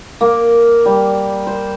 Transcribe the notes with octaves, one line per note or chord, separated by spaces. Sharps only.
A#3
G3
C5